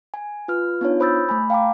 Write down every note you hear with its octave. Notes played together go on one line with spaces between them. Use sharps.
G#5
F4 B4 F6
B3 D4 D#4 F4 C#5
C5 B5 D#6 E6 G6 A6
A3 G#5 B5
F5 G5 A5 A#5 D6